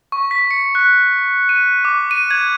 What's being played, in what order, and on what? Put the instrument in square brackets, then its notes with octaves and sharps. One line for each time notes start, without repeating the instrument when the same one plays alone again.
[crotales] C#6
B6
C#7
F#6
D#7
D6
D#7
G#6